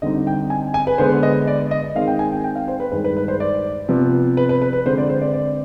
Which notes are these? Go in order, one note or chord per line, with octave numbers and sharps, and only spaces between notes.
D3 G3 C4 D#4 D#5
G5
G#5
G#5
B4
D3 G#3 B3 C5
D#5
D5
D#5
D#3 G#3 C4 F5
G5
G#5
G5
G5
F5
C5
B4
G2 D#3 G#3 B4
B4
B4
C5
D5
C3 F3 B3
B4
B4
B4
B4
D3 G#3 C4 C5
D5
C5
D5
D5